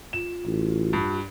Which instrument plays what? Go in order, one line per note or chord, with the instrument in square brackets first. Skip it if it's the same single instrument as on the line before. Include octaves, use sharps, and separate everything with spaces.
[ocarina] F4 [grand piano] E7
[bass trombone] A1
[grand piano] G2